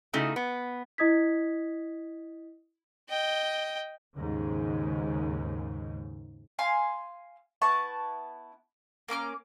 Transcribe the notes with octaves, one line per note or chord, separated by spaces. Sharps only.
C#3 A3 D#4 E4 F#4
B3
E4 D#5 D#6 G#6 B6
D#5 G5
D#2 G#2 C#3
F5 G#5 C6
B3 E4 A5 C#6
A#3 C#4 D6 F6